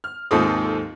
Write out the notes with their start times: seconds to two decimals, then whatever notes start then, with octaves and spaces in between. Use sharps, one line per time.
0.04 F6
0.31 D#2 G#2 C4 F4 A4 D#6